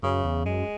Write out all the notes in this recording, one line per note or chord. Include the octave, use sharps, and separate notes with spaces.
F#2 C#3
E2
F#2 G#3